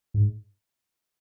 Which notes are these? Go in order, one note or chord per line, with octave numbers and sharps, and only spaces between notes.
G#2